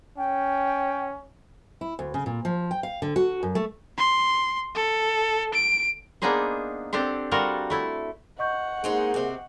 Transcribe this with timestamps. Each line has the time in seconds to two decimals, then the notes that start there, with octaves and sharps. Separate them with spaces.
0.18 C#4 G5
1.81 E4
1.99 D2
2.14 C#3
2.26 A#2
2.45 F3
2.71 G5
2.83 F5
3.02 D3
3.16 F#4
3.43 F#2
3.55 A3
3.98 C6
4.75 A4
5.54 D7
6.22 A#3 B3 D4 D#4 G#4 C5
6.93 C4 D4 G4 A4 C5
7.31 G3 F4 F#4 A4 A#4 A#5
7.70 A3 E4 A4
8.39 D#5 F#5 C#6 G6
8.84 G#3 A#3 C4 D#4 G#4
9.14 C3 C4